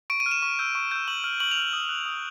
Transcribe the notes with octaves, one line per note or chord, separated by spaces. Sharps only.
C#6 D7
D#7
F6
E7
C#6
E6 G6
C#6
E6 G6
C#6 F#7
F6
C#6 F#7
F7
F6
F#7
D#6
F#6
D#6